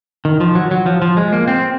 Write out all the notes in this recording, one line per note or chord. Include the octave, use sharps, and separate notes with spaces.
D#3
F3
F#3
F#3
F3
F3
G#3
A#3
C4